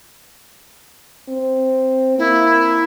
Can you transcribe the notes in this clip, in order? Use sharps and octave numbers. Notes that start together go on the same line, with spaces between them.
C4
A#3 E4